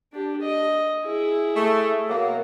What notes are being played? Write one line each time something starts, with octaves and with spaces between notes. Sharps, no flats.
D4 G4
D#5
E4 G#4
A3
B2 F#3 A#3